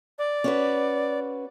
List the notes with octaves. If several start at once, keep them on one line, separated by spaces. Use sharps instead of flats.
D5
C#4 F#4 B4